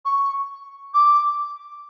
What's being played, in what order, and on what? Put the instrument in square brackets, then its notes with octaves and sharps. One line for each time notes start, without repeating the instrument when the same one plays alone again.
[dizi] C#6
D6